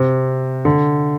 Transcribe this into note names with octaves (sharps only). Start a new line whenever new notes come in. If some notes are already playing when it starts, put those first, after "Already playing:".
Already playing: C3
D3